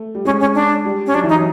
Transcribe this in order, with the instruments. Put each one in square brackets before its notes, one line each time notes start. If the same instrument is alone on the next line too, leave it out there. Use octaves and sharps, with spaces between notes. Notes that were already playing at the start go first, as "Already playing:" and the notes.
Already playing: [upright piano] A3
G3
[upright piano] G#3 [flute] C#4
[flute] C#4
D4
[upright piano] G3
[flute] C#4
[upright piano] F#3 [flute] D4
[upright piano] E3
[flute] D#4
[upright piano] F#3